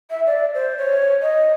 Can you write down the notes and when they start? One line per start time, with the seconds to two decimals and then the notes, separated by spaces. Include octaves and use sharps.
0.10 E5
0.26 D5
0.54 C5
0.78 C#5
1.22 D#5